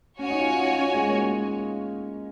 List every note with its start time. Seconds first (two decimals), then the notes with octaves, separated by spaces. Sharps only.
0.19 C#4 F#4 C#5 G#5
0.30 D#4
0.39 F4
0.59 D#4
0.79 C#4
0.94 G#3
1.09 A#3